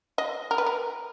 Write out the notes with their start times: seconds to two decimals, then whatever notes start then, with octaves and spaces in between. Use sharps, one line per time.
0.18 D#5
0.51 A#4
0.58 B4
0.66 A#4